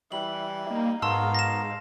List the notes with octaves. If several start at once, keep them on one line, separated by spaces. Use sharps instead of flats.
E3 G3 F#7
A#3 D#4
G#2 B3 F#4 A#4 F5 A5 C6 E6
A#6 E7